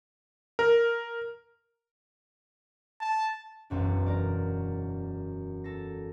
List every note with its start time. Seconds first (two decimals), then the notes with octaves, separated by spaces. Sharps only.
0.59 A#4
3.01 A5
3.70 E1 B1 F#2 D4
4.06 A#4 D5
5.64 A4 A#6